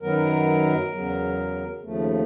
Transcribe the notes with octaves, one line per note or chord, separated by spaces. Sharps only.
F#2 D#3 F#3 B3 A#4
E2 C#3 F#3
D#2 C#3 F3 A3